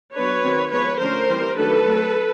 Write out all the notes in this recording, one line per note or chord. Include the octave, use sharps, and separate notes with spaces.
F#3 B3 D4 B4 C#5
D#3 F#3 A3 C4
F3 G#3 B3 B4 C#5
D3 F3 A3 C#4 A#4 C5
E3 G3 C4
D#3 F#3 A3 D4 A4 B4
F#3 A3 C4